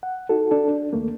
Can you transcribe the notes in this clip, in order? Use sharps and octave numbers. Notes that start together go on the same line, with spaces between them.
F#5
D#4 F#4 A4
D4 A4
D4
D#2 A3 A#3